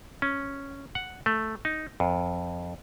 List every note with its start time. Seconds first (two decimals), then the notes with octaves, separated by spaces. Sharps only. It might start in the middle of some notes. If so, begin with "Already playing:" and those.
0.22 C#4
0.95 F#5
1.26 A3
1.65 D#4
2.00 F2